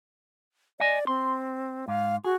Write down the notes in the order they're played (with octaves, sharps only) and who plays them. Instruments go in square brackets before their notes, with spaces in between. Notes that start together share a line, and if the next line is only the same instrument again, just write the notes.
[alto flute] D5 [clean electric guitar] D#5 G#5
[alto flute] C4 [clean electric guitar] C6
[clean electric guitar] G#2 [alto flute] F5
[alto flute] F#4 [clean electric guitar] G#4